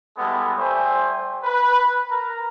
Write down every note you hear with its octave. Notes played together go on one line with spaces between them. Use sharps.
G3 G#3 B3 E4 A4
G3 A3 C5 E5 G5 G#5
B4
A#4 A#5